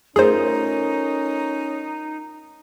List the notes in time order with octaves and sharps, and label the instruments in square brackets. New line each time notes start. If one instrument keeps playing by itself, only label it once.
[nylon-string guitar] A3 F4 A#4 [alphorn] C#4 [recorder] D#4 [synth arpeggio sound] G#4 C5